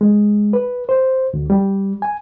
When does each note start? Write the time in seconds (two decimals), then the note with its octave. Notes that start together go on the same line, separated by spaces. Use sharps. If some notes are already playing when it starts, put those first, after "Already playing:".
0.01 G#3
0.53 B4
0.89 C5
1.34 D2
1.50 G3
2.02 G#5